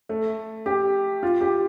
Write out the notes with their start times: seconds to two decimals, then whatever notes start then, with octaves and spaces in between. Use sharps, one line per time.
0.09 A3
0.66 G4
1.23 F4
1.41 G4